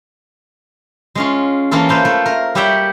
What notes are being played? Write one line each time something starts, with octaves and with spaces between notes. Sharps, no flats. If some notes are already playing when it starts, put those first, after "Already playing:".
G#3 C#4 F4
E3 A#3 C#4 F4 A4
A4 B4 C5 F5
A3
A#4
G3 G4 C#5 E5 F#5 G5